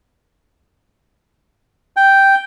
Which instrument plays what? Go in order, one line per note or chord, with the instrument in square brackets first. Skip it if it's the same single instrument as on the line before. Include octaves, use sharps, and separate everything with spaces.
[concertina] G5